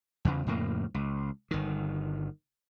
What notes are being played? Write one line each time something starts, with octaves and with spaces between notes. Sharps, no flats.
E2 C#3
F2 A2 C#3 A#3
C#2
G1 D#3